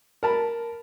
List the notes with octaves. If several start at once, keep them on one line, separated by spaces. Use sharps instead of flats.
A#4 A5 B5